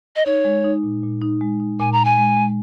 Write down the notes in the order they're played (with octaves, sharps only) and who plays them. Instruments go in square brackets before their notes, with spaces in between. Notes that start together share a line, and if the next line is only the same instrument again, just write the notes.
[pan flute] D#5
[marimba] D#4 [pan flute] C#5
[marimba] G#3
D#4
A#2
A#2
D#4
G#3
D#4
[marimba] A#2 [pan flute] G#5
[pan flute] A#5
[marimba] A#2
[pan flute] G#5
[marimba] G#3
G#3